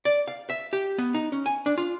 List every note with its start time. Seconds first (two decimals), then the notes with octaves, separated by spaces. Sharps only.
0.05 D5
0.28 F5
0.50 E5
0.73 G4
0.98 B3
1.14 D#4
1.32 C#4
1.46 G#5
1.66 D4
1.78 F4